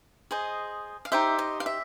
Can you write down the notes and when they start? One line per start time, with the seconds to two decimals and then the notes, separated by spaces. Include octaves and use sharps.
0.31 G#4 C5 D#5
1.05 F5
1.12 D#4 G4 C5 E5
1.39 D#5
1.60 F5
1.66 E5